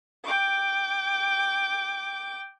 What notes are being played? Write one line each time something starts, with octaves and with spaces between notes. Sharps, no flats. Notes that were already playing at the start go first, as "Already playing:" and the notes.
G5 D6